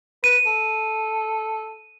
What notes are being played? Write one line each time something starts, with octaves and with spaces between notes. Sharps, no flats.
B4 D#7
A4